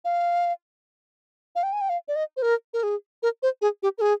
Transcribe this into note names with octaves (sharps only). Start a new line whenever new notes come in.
F5
F5
G5
G#5
G5
F5
D5
D#5
C5
A#4
A#4
G#4
A#4
C5
G#4
G4
A#4
G#4